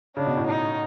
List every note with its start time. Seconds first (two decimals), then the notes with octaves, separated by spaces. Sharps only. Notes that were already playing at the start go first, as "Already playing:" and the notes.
0.16 C#3 D4
0.26 B2
0.37 A2
0.46 D#4